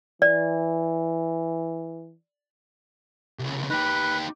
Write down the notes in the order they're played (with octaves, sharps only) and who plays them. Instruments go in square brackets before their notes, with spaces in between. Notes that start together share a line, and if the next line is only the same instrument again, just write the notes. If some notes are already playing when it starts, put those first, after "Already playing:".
[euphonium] E3 [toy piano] D5
[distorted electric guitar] C2 C#3
[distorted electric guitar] D#4 G4 [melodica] B4